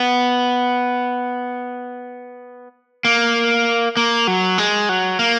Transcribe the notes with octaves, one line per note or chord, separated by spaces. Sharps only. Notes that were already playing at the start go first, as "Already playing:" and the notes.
Already playing: B3
A#3
A#3
F#3
G#3
F#3
A#3